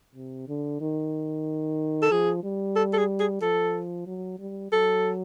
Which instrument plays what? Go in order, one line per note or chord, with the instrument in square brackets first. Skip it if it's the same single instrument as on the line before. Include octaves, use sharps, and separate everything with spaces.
[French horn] C3
D3
D#3
[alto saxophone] A4
[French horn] F3 [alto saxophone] G#4
[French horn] G3
[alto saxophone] A4
A4
G#4
G#4
[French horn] F3 [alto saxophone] A4
[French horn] F#3
G3
[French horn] F#3 [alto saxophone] A4